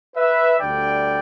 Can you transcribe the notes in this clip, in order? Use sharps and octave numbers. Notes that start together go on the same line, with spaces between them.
B4 E5
D2 D3 G3 D5 G5